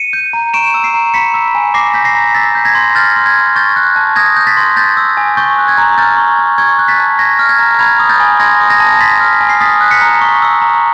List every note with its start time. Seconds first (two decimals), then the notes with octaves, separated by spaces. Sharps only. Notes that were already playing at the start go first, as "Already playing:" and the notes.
Already playing: C#7 D#7
0.13 G6
0.33 A#5
0.54 C#6 D7 E7
0.74 E6
0.84 C7 D7
0.94 A#5
1.14 B5 B6 C#7
1.34 E6
1.55 G#5
1.74 D6 A#6 C7
1.94 G6 B6
2.05 A#6 C7
2.15 A#5
2.34 E6 A6 B6
2.55 G6
2.65 G#6 A#6
2.75 C6
2.95 F6 G6 A6
3.16 C6
3.26 G#6
3.35 C6
3.55 C#6 G6 A6
3.76 F#6
3.96 A5
4.16 D#6 G#6 A#6
4.37 G6
4.47 A6 B6
4.57 C6
4.76 C6 G6 A6
4.97 E6
5.17 G#5
5.37 C#6 G6 A6
5.58 F#6
5.68 G#6
5.78 A#5
5.98 F6 G6 A6
6.18 C#6
6.39 C#6
6.58 C#6 G#6
6.79 F#6
6.88 A6 B6
6.99 A5
7.19 C#6 G#6 A#6
7.39 F6
7.49 G#6
7.59 A#5
7.79 B5 G#6
7.99 D#6
8.09 G6 A6
8.20 G#5
8.40 C6 G#6 A#6
8.60 D#6
8.70 G#6 A#6
8.80 A5
9.00 C6 A6 B6
9.20 F6
9.41 G#5
9.49 C7
9.61 D#6 A6 B6
9.81 F#6
9.91 B6 C#7
10.02 A#5
10.21 C#6
10.42 E6
10.62 A#5